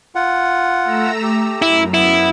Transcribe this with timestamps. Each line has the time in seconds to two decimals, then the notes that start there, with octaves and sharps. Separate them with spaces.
0.15 F4 F#5
0.82 A3 A#5 E6
1.23 G4
1.62 F#2 E4
1.94 B3 E4